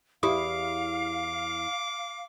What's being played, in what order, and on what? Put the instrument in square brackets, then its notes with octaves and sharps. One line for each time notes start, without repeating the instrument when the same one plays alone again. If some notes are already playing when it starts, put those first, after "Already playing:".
[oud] E2 E4 [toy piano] G4 D#6 [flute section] F5 [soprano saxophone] D6